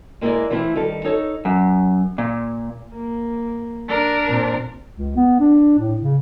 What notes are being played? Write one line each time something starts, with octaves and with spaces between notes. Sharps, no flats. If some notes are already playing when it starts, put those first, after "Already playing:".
G#3 A#3 E4 G4 G#4 D5
E3 A3 C4 E4 F4
D#3 G3 A4
D#4 A4 C#5
F#2
A#2
A#3
D4 A#4
A#2 C4
C#2
B3
D4
A2
C#3